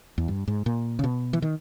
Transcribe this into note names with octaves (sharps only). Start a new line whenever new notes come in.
E2
G2
G#2
A#2
C#3
B2
E3
D#3